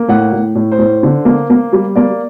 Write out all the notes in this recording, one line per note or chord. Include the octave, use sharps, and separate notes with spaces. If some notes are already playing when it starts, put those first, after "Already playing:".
Already playing: A#3
A2 F#5
A2
A2
C5
A2
D3
A#3
A#3
G3
A#3 D5